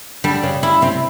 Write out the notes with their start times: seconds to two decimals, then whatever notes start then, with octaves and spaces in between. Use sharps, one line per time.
0.24 D3 G3 D4
0.43 C#3 C#4
0.63 C#3 C#4 E4
0.82 C3 C4